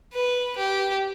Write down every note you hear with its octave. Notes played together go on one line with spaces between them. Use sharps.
B4
G4